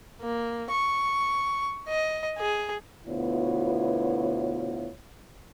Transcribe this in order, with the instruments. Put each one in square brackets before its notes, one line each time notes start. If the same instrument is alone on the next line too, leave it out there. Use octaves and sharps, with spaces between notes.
[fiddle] A#3
C#6
D#5
G#4
[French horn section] D2 B2 B3 E4 F4 C#5